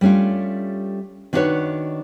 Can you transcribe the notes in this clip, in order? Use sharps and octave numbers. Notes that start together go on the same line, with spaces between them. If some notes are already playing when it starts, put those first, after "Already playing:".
G3 A3 C#4 D4 F4
D#3 D4 E4 F#4 B4 C#5